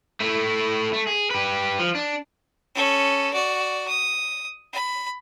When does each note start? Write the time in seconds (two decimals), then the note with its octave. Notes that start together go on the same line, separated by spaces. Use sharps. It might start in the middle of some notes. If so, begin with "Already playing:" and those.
0.20 A3 E4
0.93 A3
1.07 G#4
1.31 G4 B4
1.79 F3
1.95 D4
2.75 C#4 A4
3.33 F#4 D5
3.88 D#6
4.73 B5